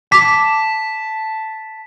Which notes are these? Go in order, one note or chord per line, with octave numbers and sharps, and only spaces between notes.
A5 D6 B6